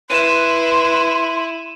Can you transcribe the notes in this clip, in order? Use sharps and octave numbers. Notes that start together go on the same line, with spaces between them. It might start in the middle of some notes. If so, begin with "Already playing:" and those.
E4 B4 C6 D#7 E7